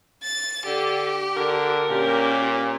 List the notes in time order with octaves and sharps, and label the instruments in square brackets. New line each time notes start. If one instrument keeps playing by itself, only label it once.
[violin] A6
[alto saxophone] D3 [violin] G4
[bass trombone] D3 [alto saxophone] A#4
[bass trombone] A#2 [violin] C#4 [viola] G4